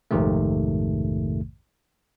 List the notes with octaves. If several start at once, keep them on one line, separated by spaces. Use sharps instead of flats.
A#1 F2 G#2 C3 D#3 A3